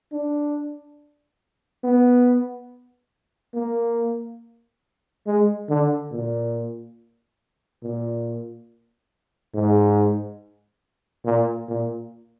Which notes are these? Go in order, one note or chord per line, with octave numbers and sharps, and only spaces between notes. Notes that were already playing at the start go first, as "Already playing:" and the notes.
D4
B3
A#3
G#3
D3
A#2
A#2
G#2
A#2
A#2